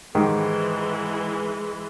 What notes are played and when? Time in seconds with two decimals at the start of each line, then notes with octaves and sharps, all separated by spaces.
0.15 G#2 D#3 E3 G#3 G4